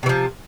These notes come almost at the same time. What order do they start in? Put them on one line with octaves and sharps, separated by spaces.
C3 E3 F3